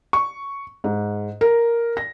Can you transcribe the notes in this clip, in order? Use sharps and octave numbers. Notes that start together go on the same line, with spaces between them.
C#6
G#2
A#4
A#6